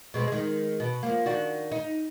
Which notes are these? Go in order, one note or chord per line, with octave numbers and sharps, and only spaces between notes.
B2 G#3 C4
D#3 G#3
B2
F3 A#3
D#3 D4 F#4
D#4